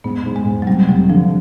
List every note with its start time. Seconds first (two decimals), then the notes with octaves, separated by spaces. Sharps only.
0.04 G#2 B3
0.26 G#2
0.36 G#3
0.46 G#2
0.62 F#3
0.67 F1 G3
0.89 F1 F#3
1.10 D3 F3